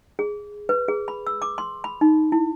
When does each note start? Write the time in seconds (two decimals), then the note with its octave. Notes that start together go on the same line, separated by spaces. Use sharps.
0.19 G#4
0.69 B4
0.88 G#4
1.08 B5
1.27 E6
1.42 D6
1.58 C6
1.84 B5
2.01 D#4
2.32 E4